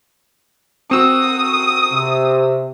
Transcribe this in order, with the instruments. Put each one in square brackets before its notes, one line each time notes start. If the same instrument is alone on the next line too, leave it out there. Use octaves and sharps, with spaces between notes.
[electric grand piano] C4 F#4 [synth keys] C#6 E6 [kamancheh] D#6
[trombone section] C3